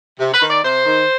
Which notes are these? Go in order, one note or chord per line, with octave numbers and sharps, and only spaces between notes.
C3
B4
D#3
D5
C3 C5
D#3